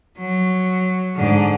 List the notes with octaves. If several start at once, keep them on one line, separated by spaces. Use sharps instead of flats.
F#3
G#2 D3